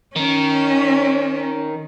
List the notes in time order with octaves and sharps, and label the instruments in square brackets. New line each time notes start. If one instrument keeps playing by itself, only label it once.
[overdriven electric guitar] D#3 [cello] C#4